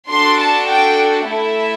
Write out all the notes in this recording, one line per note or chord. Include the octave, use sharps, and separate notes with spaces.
D4 F#4 A4 C6
A5
G5
A3 E4 A4 E5